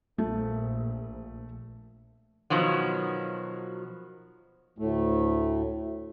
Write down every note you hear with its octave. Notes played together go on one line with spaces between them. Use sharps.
A#1 A3
B2 D#3 F3 F#3
D2 A2 A3